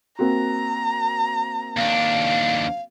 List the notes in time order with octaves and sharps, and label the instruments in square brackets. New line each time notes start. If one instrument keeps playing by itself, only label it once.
[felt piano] A#3 C4 F#4 [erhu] A#5
[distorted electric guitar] D#2 D4 [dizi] F5